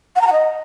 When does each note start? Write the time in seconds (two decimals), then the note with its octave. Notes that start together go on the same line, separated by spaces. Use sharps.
0.16 F#5
0.21 A#5
0.27 F#5
0.32 D#5